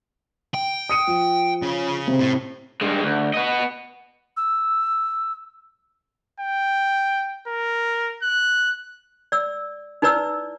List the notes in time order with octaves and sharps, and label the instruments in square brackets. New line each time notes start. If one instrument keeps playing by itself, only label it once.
[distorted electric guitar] G5
[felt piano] D#6 C#7 D#7
F3
[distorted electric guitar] C#3
[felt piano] C3 C4
[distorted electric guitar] A2
[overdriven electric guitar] G2 G#3
D2
B3 D#5
[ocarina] E6
[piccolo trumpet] G5
A#4
F#6
[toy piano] D5 E6
D#4 E4 B4 D5 E6